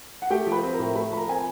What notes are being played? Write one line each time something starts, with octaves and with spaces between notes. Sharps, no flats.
F#5
A3 G4 G5
F3
B4 B5
C4
A#4 A#5
A2
A3 B4 B5
F3 B5
A#4 A#5
C4 G#5